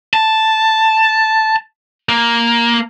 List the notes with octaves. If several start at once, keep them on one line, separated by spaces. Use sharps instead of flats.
A5
A#3